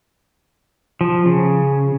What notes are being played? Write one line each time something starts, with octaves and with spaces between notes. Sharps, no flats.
F3
C#3